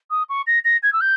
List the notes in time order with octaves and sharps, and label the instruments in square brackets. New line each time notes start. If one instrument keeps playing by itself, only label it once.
[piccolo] D#6
C#6
A#6
A#6
G#6
E6
G6